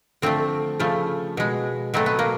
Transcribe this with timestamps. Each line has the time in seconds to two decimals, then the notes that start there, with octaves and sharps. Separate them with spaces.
0.22 D3 F3 A3 C4
0.80 C#3 F3 A3
1.37 B2 G#3
1.94 B2 F#3 A3 C4
2.06 B3
2.19 A#3